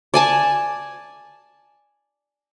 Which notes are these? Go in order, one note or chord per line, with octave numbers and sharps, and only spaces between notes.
D5 G#5 A5